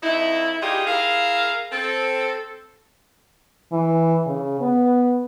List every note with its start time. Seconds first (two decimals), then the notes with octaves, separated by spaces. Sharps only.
0.03 F2 D#4 E4
0.61 G3 D#4 F4 G4 G#4
0.87 E4 G#4 A#4 F5
1.72 C4 A4
3.72 E3
4.26 C#3
4.60 B3